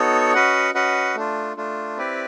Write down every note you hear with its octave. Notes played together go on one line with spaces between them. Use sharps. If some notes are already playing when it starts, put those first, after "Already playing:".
Already playing: B3 D#4 F#4 A4 C#5
C#4 F#4 B4 D#5 F#5
C#4 F#4 B4 D#5 F#5
A3 D4 F4
A3 D4 F4
C4 E4 G4 B4 D5